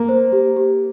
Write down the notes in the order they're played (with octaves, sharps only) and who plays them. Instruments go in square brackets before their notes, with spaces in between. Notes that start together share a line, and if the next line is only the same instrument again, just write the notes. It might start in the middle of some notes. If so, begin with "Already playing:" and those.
Already playing: [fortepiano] A#3
[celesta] C5
G4
G4